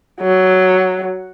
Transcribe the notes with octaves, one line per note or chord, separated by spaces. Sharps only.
F#3